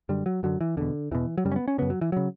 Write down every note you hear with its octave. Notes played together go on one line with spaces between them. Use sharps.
F#2 D3 G3
F#3
F#2 D3 F#3
E3
E2 B2 D3
E2 B2 E3
F#3
F#2 C#3 G3
C#4
B3
C#4
F#2 C#3 B3
F#3
E3
C#3 F#3